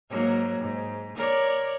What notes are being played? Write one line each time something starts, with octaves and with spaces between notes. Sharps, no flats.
G#2 F#3 A#3
G#2
A#4 C#5 D5